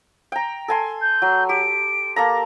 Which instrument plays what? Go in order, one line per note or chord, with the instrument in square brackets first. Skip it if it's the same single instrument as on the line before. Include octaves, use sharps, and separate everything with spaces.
[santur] G5 A#5
A4 G#5 C6
[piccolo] G6
[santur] F#3
[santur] G4 [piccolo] D7
[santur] A#3 A4 A#5